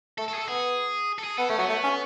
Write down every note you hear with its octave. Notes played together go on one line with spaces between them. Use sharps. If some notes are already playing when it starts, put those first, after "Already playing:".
A3 A4
A4
G#4
A4
B3 G#4
A4
G#4
B3 A4
A3 C#4
F#3 B3
A3
C#4